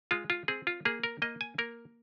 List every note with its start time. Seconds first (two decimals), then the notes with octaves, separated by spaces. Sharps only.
0.11 G#3 F4
0.30 F4
0.48 C4 G#4
0.67 F4
0.85 A#3 G#4
1.03 A#4
1.22 A#3 D#5
1.41 G#5
1.58 A#3 A#4